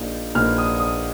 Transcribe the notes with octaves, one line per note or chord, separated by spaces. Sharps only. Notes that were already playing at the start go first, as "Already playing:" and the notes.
Already playing: A#1 A#2 A#3 D#4
A#1 A#2 A#3 D#4 F6
D#6
D#6